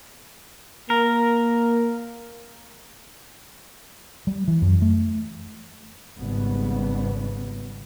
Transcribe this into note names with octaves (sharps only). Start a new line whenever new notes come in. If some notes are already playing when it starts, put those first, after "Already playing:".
A#3 A#4
G3
E3
F#2
A3
G#1 G#2 C#3 G3 B3